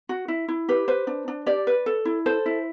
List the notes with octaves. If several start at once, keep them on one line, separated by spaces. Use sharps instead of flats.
F#4
E4
E4
G4 B4
B4 C5
D4
D4
G4 D5
B4
A4
E4
A4 C5
E4